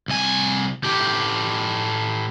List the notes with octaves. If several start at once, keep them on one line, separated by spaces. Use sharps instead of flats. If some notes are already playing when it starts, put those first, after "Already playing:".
C2 G#5
A2 G4